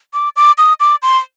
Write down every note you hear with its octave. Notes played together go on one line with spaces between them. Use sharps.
D6
D6
D#6
D6
C6